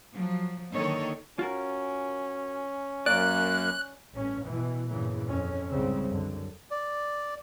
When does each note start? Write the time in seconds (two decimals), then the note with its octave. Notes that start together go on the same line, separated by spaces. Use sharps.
0.12 F3 F#3
0.72 D3 D#3 A#3 A4 C#5 D#5
1.39 C#4 F4 F#4 A#4
3.06 F#2 A#3 D5 F#6
4.13 A1 G2 C#4
4.45 B2 E3
4.89 E2 G2 A#2 C#3 E3
5.27 F2 C#4
5.70 C2 G#2 C#3 G3 C4
6.09 F#2 D3
6.71 D5